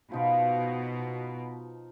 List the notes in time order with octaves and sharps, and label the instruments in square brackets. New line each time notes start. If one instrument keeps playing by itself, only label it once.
[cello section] B2 [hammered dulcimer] F3 D#4 F4